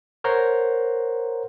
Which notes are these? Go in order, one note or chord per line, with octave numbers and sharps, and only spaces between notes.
A#4 C5 C#5 F#5 A#5 C6